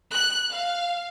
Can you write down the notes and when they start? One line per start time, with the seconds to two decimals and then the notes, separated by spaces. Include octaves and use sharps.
0.11 F#6
0.53 F5